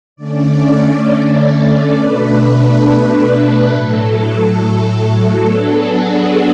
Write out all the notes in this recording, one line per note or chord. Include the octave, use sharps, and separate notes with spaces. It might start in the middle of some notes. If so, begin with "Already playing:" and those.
D3 A3 C#4 D5
B2 A3 D4 B4
A2 F#3 A3 A4
F#3 B3 D4 A4
G#4
F#4